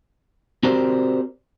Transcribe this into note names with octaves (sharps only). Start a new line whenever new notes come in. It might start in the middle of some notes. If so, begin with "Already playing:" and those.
C4 F#4 G4 A#4 C5 D5